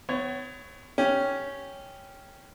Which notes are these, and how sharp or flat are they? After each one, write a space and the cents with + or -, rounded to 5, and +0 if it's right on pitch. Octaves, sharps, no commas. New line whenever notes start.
B3 +40 C#5 +0
C#4 +0 G4 +0